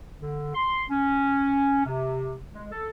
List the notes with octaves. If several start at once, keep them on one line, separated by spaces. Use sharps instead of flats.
D3
C6
C#4
C3
G#3
A4